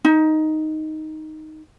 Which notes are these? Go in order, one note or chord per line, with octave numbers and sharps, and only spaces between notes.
D#4